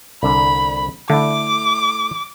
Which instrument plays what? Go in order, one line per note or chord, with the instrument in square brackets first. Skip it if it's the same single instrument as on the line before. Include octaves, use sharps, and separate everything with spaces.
[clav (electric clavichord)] C2 D3 [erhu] B5
[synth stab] D3 [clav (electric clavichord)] A3 E4 [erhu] D6